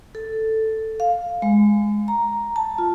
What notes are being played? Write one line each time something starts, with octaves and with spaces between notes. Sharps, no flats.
A4
F5
G#3
A#5
A5
F4